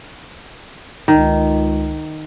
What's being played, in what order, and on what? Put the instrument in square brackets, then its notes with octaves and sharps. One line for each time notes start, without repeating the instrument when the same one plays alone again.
[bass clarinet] C#2 [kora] D#3